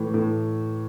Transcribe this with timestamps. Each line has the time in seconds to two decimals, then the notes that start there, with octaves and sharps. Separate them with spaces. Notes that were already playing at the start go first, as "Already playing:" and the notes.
Already playing: A2 E3
0.14 A2